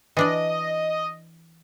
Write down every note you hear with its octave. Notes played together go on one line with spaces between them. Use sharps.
E3 D4 D5 D#5